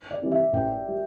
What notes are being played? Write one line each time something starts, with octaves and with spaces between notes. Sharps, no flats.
D5
C3 E3 G3
E5
A1 G5
G3